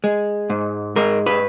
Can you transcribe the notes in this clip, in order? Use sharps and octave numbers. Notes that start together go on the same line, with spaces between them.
G#3
G#2
G#3 A#4
B4